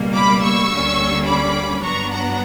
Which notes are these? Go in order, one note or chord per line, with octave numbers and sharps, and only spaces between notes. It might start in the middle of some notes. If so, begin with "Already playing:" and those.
Already playing: C#2 B2 G3 A#3
B5 D6
C#6 E6
D2 D3 G3 A#3 C#4
B5 D6
G2 F#3 B3 D4 A#5 C#6
F#5 A#5